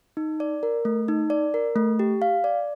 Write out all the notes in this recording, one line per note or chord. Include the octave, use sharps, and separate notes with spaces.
D#4
D5
A#4
A3
D#4
D5
A#4
A3
G4
F5
D5